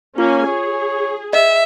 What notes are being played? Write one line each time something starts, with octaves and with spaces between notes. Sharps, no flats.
A#3 C#4 F4 G#5
G#4 C#5
D#5 E5